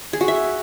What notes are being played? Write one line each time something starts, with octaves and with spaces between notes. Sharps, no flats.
G#4
F#4
E5